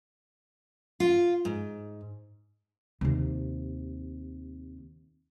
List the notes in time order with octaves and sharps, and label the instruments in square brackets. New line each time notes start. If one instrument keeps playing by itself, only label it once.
[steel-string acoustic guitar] F4
G#2
[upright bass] D#2 C3